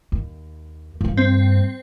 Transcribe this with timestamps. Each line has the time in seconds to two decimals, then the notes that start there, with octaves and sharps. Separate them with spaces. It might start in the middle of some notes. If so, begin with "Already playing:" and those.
0.12 D#2
1.01 G2 A#3
1.17 C4